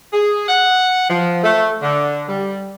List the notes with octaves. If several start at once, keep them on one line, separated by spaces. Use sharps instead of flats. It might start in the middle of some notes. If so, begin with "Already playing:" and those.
G#4
F#5
F3
A3
D3
G3